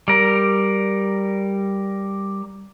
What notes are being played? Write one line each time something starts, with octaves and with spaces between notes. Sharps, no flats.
G3 A#4